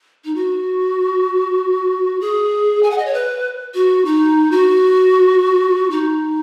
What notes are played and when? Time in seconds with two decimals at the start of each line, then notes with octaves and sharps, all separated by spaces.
0.25 D#4
0.36 F#4
2.21 G#4
2.83 G#5
2.90 F#5
2.98 D#5
3.06 C#5
3.14 B4
3.74 F#4
4.05 D#4
4.51 F#4
5.90 D#4